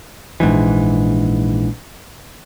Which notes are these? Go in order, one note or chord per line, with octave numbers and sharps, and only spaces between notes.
A#1 G#2 E3